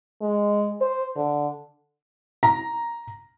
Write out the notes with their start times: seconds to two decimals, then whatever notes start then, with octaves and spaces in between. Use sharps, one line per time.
0.21 G#3
0.81 C5
1.16 D3
2.43 A#5